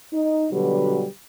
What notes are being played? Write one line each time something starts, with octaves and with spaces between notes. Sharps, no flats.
D#4
B2 D3 F#3 G3 G4 B4